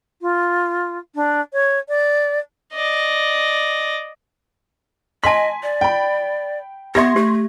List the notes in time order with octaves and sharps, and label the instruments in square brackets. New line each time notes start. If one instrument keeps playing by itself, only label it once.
[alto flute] F4
D4
C#5
D5
[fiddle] D5 D#5
[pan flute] D#5 [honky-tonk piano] G#5 B6 [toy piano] A5 C6
[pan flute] D5
[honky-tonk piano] G5 B5
[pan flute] B3 [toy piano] G4 E5 [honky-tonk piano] C6 G#6 A#6
[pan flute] A3 [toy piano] G4